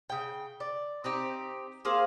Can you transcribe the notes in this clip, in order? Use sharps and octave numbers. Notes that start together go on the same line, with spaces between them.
C#3 G5
D5
C4 D#4 G4
A#3 G#4 C5 F5